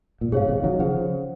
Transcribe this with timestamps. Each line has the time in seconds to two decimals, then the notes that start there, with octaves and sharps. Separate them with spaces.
0.21 A#2
0.32 G#2 C3 G#4 C#5 F5
0.48 C3 D#3
0.63 D#3 F#3
0.79 C#3 F3 G#4 C5 F#5